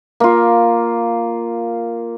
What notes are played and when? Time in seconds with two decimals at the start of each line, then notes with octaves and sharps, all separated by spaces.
0.20 A#3 F4